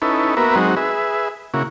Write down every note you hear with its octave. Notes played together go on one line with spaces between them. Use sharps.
C#4 D#4 E4 A4 B4
A#3 B3 F#4 A#4 B4 E5
F#3 G#3 C4 D#4 F#4
G#4 B4 E5
C#3 A#3 E4 F#4